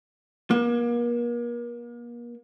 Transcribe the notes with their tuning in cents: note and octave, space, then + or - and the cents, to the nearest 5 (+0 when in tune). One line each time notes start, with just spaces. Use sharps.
A#3 +40